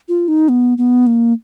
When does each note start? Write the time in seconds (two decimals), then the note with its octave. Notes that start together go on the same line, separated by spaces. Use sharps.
0.09 F4
0.28 D#4
0.49 B3
0.78 B3
1.07 A#3